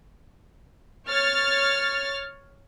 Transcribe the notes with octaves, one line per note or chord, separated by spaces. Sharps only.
C#5 F6 A6